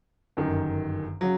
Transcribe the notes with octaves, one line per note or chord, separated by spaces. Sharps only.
G1 F#2 D#3
C#3 F#3